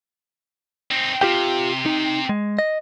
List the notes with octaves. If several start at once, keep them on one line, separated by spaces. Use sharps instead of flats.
C4 D#4
C3 F4 G4 G5
D#4
G#3
D#5